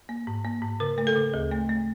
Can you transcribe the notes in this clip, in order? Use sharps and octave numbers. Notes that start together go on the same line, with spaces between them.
A#3
G#2
A#3
G#2
C#3 A#4
A3 A#4
A4
C#3
D2 G#4
A3
A3